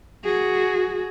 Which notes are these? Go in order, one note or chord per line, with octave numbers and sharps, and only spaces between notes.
F#4 G#4